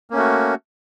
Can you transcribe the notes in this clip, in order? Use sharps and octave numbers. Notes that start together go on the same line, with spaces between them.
A3 A#3 C#4 F#4